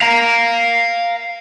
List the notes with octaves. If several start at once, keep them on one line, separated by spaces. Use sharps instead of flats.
F5 A#5